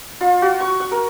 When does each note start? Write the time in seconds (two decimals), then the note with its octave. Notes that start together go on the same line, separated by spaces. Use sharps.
0.21 F4
0.42 F#4
0.60 C#6
0.80 F#5
0.92 A#4